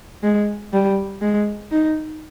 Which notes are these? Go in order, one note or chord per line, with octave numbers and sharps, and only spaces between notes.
G#3
G3
G#3
D#4